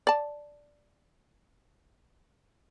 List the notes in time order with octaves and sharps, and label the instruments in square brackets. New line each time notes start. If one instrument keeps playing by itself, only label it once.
[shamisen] D5 A5